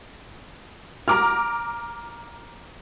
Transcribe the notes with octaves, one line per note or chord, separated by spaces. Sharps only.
A#5 D6 F6